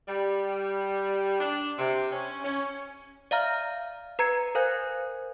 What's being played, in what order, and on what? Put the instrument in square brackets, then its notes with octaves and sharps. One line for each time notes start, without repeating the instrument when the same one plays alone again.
[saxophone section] G3
D4
C3
C#4
C#4
[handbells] D5 E5 F5 A#5 F6
B4 A#5 G#6 C#7
A#4 C5 F5 G#5 F#6 G6